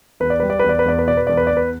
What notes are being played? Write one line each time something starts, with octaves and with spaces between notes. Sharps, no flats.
E2 B4
D5
G3 B4
D5
E2 B4
D5
B4
E2 D5
B4
B2 D5
B4
E2 D5
B4
E2 D5
B4